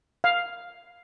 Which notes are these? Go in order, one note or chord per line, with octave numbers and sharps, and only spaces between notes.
F5